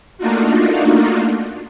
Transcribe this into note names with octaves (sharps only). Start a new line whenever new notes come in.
A3 A#3 D4 D#4 F4 F#4